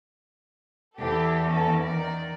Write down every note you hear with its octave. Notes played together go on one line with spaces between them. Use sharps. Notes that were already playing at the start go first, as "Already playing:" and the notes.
E2 E4 G4 A4
C#4 A4
D#3 A#4 D5